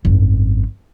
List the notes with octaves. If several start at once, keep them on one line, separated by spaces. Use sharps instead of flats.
G#1 F#2